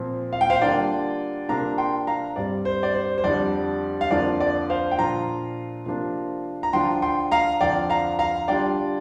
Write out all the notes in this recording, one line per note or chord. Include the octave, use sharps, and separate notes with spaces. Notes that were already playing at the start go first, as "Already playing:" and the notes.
Already playing: A#2 F3 C4
F5
G5
C5 F5
D3 G3 A#3 D4 F4 D5 G5
C3 A#3 D4 F4 F5 A#5
G5 C6
F5 A#5
G2 G3 C4 D5
C5
D5
C5
C5
F2 D3 G3 D4 D5
F5
F2 D3 A#3 D4 F4 D5
D5
C5 F5
G5
A#2 F3 D4 F4 F5 A#5
C3 F3 A#3 D4 F4
A#5
D3 F3 D4 F4 G5 C6
G5 C6
F5 A#5
F2 D3 F3 D5 G5
F5 A#5
F5 A#5
D3 G3 D4 F4 D5 G5